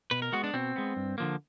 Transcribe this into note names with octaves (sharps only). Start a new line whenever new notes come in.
B2 B4
A#4
G#3 B3 F#4
D4
B2 C4
G#3 B3
G2
D3 F3 A#3